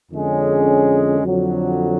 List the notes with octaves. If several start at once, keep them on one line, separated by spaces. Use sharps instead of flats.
F2 D3 G#3 C#4 G#4
F2 D3 F#3